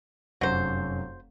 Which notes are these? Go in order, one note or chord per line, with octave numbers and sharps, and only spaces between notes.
F1 F#2 F#3 C5